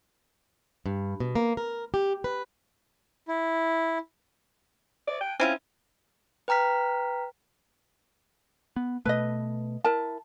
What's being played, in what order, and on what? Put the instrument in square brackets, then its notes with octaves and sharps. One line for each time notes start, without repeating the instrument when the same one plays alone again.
[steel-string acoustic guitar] G2
B2
A#3
A#4
G4
B4
[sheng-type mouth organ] E4
[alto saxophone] D5
G5
[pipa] C4 E4 F4 [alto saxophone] C#4
[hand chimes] B4 G5 A#5 F6 B6
[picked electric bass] B3
[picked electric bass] B2 A3 [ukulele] B4 D#5
[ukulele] E4 A#4 A5